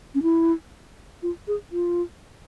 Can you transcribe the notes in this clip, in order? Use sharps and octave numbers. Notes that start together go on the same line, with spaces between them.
C#4
E4
F4
G#4
F4